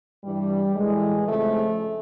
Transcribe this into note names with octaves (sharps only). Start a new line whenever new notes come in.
G2 E3 G3
A2 E3 G#3
F2 C#3 F3 A3